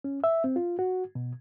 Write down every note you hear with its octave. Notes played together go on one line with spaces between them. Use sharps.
C#4
E5
C4
F4
F#4
B2